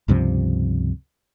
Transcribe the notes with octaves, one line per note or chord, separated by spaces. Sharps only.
C#2 G2 C3 F3